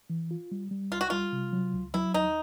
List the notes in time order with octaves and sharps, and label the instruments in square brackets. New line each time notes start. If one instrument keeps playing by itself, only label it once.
[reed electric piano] E3
F4
G3
G3
[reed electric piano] C2 [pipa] F4
[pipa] F#4
[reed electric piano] G3 [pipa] F4
[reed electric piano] C3
F#3
C#2
[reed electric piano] F#3 [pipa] E4
[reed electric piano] D#2 [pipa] D#4